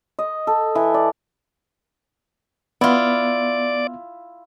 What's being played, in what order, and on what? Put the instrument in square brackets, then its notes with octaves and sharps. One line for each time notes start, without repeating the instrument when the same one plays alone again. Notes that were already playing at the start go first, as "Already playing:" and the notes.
[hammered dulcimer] D#5
A4
E3
D5
[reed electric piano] B3 [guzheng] E4 F4 [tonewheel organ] D5